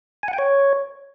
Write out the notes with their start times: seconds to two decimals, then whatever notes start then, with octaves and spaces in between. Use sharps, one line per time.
0.23 G#5
0.28 F#5
0.33 G5
0.38 C#5